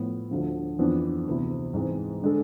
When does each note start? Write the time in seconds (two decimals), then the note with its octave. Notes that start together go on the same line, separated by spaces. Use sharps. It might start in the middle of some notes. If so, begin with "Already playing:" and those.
Already playing: A2 F3 B3
0.31 D2 D3 F3
0.79 F2 E3 B3 D4
1.26 D2 C3 E3 B3 E4
1.73 G#2 E3 G#3 C4
2.22 D3 G#3 D4 A4